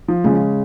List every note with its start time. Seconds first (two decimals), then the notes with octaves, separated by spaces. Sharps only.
0.08 F3
0.24 C#3 G#3